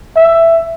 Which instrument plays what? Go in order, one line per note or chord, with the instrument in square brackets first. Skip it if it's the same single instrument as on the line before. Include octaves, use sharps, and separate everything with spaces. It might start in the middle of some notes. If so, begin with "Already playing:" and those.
[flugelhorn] E5